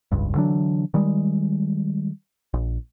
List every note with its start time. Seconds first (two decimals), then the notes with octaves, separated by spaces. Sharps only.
0.12 F1 C#2 G2
0.35 D3 E3 F#3 D4
0.94 D#3 G3 G#3
2.54 A#1